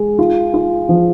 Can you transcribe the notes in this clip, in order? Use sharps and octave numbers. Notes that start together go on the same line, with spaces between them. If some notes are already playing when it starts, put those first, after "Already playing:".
Already playing: G#3
F4
F4
F3